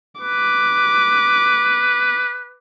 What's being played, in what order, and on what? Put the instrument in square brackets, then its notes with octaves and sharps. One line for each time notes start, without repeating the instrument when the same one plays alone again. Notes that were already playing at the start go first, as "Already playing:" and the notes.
[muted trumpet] B4 [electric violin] D6